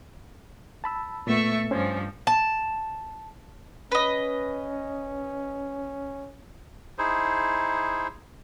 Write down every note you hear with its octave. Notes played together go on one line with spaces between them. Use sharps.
A5 B5 E6
A#2 A3 B3 E5 C#6
G2 F3 C#4 C5 G#5
A5
C#4 B4 D#5
D#4 E4 G#4 C5